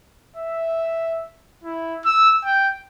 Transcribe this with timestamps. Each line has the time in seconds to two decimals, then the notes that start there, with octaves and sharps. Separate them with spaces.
0.36 E5
1.64 E4
2.05 E6
2.44 G5